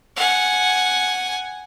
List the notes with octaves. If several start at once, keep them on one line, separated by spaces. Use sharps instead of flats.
F#5 G#5